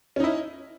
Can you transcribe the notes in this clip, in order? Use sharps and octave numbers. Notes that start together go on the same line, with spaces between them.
C#4 D#4 E4